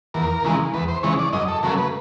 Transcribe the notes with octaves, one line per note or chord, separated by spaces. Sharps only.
E2 A#4
C#3 E3 G#3
E2 B4
C5
C#3 E3 G#3 C#5
D5
F#2 D#5
A4
C#3 F#3 A3 A#4
B4